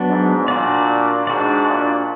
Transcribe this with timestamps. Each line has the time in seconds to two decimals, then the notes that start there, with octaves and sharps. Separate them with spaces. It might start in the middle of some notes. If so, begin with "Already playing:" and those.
Already playing: F#3 B3 D4
0.09 G#2
0.48 A#2 D4 F#4 D5
1.27 G#2 D4 F#4 D5
1.67 A#2